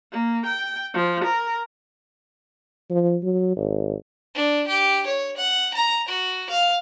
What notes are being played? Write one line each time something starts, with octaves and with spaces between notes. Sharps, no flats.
A#3
G5
F3
A#4
F3
F#3
G#1
D4
G4
C#5
F#5
A#5
F#4
F5